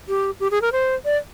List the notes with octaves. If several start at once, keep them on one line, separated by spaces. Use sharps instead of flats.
G4
G4
G#4
A#4
C5
D5